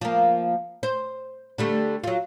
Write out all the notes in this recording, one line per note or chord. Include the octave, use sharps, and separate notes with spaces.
F3 A#3
C5
D3 G3 A3
F#3 F4